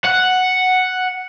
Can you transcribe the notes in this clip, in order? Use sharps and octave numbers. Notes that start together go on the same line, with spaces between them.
F#5